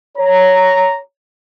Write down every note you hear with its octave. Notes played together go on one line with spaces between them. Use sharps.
C#5 A#5